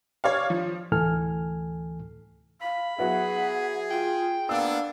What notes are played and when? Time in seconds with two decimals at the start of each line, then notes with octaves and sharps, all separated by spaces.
0.24 C#5 D5 F5
0.50 F3
0.92 D2 A2 E3 A4 G#5 F6
2.62 F5 B5
2.98 F#3 B3 E4 G#4 F#5
3.90 F4 G5
4.49 A#3 B3 D4 F5 E6